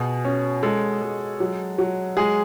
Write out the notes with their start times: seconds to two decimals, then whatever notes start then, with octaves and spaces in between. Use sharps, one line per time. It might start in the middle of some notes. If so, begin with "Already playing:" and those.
Already playing: B2 G#4
0.25 C#4
0.63 G#3 A4
1.02 G#3
1.40 F#3
1.78 F#3
2.17 G#3 G#4